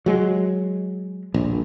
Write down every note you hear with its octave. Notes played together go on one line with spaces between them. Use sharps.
F#3 G#3
D#1 A#1